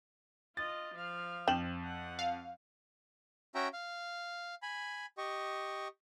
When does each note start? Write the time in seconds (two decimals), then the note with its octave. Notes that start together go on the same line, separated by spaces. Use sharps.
0.57 F4 D#5 A6
0.94 F3 F5
1.48 F2 G5 E7 F#7
1.84 F#5
2.19 F5
3.55 C#4 F#4 E5 G5 A#5
3.73 F5
4.62 G#5 B5
5.18 G4 D#5 C#6